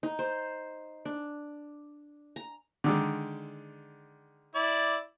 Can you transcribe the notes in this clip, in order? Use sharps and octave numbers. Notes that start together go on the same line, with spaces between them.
D#4
C5
D4
A#5
D3 D#3 G#3
E4 D5